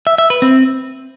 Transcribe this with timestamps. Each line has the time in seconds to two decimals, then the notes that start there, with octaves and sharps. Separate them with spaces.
0.07 E5
0.18 E5
0.30 B4
0.42 C4